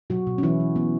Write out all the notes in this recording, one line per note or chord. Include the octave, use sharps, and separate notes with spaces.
B2 F#3 F#4
B2
C#4
E3 F#3 E4
F#3
F#3 B3